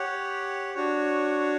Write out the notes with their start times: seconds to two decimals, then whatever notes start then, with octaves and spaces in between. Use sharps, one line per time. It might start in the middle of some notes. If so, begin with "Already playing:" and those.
Already playing: G4 C#5 F#5
0.75 D4 F#4 C#5